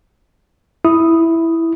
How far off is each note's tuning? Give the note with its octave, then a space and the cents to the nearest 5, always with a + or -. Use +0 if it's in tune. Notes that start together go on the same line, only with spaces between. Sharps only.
E4 +0 D#6 +0